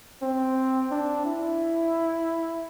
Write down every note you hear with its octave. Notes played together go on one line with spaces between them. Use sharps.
C4
D4
E4